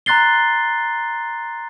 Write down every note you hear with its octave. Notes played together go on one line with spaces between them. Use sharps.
A#5 C6 F#6 A6 C7 G7